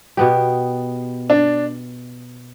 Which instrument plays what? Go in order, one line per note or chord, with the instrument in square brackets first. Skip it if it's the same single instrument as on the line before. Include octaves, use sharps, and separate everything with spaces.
[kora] B2 B3 G4
[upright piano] D4